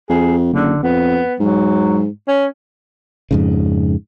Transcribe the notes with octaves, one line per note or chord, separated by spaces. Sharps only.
F2 G#4
F#1 D3
F2 B3
G#2 F#3
C#4
F2 G#2 C#3